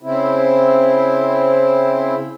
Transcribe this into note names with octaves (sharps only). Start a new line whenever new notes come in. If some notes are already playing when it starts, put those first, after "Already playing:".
C#3 C4 E4